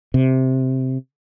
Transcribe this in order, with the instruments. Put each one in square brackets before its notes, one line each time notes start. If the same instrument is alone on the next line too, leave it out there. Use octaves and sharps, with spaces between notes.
[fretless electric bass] C3